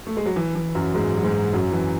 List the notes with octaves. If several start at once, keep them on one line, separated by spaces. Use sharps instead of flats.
A3
G#3
F#3
E3
E3
F#2 F#3
G#2 G#3
F#3
G#2 G#3
F#2 F#3
E3